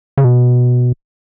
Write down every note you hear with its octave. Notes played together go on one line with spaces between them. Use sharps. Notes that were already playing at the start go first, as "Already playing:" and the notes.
C#3
B2